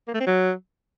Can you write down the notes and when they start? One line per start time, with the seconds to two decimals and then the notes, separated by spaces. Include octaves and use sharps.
0.08 A#3
0.14 A3
0.20 C4
0.27 F#3